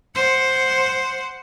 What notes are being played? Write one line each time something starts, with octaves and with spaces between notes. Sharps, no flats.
C5 F#5